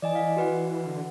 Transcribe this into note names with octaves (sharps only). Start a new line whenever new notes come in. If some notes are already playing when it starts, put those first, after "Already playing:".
E3 D5 D#5 G#5
F5
F#4 B4 F#5
D3